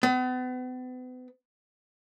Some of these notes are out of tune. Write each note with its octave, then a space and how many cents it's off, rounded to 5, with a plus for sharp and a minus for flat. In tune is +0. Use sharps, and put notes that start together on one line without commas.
B3 +40